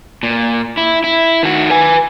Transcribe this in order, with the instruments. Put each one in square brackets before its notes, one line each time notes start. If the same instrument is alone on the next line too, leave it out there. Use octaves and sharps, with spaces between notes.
[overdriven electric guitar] A#2
E4
E4
D#3 F#4
B4 G#5